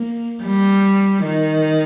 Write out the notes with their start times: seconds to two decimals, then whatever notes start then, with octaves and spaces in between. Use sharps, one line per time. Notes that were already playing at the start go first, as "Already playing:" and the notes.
Already playing: A#3
0.42 G3
1.24 D#3